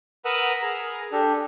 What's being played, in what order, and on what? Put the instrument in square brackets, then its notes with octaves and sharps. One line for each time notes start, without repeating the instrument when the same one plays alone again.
[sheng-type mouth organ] A#4 B4 F#5 A#5 D#6 E6
G#4 A#4 A#5
D4 G4 A4